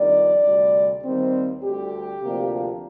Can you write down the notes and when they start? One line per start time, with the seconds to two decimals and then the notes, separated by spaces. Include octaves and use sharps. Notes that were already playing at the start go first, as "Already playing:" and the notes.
Already playing: F2 D#3 G3 D4 D5
0.44 D2 C3 G3
1.04 D#2 D#3 G3 C4
1.63 D2 D3 G3 G4
2.22 D2 C3 F3 A#3 D4